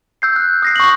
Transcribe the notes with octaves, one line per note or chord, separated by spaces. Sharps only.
E6 G6 C7
F#6
D#6 A#6 C7
C#6 F#7